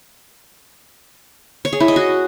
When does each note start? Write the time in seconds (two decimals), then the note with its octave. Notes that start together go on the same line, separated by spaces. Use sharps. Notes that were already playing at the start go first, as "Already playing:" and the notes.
1.65 C#5
1.73 G#4
1.80 E4
1.88 D#5
1.96 F#4